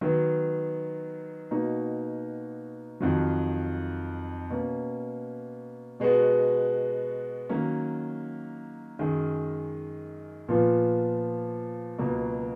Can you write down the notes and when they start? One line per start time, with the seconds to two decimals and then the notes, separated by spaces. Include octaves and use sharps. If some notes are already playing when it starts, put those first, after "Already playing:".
0.01 D#3 F#3 B3
1.51 B2 A#3 D#4 F#4
3.00 F2 D#3 F#3
4.50 B2 A#3 C#4
6.00 B2 G#3 B3 F#4
7.49 D#3 F#3 A#3 C#4
8.99 F#2 D#3 G#3
10.49 A#2 F3 B3 F4
11.98 C#2 B2 F#3 A#3